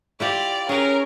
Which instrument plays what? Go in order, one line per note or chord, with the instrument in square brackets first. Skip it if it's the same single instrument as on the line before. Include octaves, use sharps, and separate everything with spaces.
[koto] E4 F4 G4 [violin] D5 F5
[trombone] C#4 [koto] G#4 B4 [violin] A#4